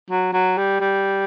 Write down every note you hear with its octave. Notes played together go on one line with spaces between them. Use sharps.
F#3
F#3
G3
G3